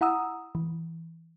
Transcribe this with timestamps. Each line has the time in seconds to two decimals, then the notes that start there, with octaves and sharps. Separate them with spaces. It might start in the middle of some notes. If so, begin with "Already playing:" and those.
0.01 E4 F#5 A#5 D#6 E6
0.55 E3